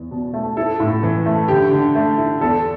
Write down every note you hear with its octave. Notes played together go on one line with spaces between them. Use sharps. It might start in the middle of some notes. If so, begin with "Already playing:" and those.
Already playing: E2
B2
A3
E4 A4
A2
E3
A3
D3 G4
D3
A3
E4
E2 A4